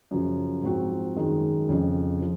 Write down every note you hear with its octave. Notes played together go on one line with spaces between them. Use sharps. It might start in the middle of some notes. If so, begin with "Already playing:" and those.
F#2 C#3 F3
G#2 F3 C4 F#4
F#2 D#3 G#3 D#4
F2 C#3 F3
F3